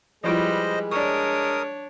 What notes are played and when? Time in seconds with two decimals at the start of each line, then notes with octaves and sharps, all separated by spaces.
0.24 F3 G3 G#3 E4 F4 B4 C5 D#5
0.91 D4 A#4 C#5 D5 C#6 D#6